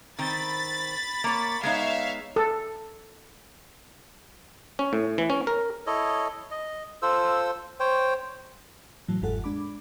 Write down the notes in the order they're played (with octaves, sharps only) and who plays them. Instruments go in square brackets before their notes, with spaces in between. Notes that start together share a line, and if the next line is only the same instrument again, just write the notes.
[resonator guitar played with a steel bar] D#3 C4 [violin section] B5 A6
[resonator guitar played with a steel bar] A#3 C#5
[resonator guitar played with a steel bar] G#3 B3 D#4 [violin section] C#5 E5 F5
[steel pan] A4
[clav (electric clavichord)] C#4
A2
E3
C#4
A#4
[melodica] E4 A4 C#5 D#5
D#5
F4 A4 C5 E6
C5 C#5 G5
[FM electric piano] A2 E3 F#3
G1 E2 G#2 F4 A4 F#5
G#3 D4 B5 D6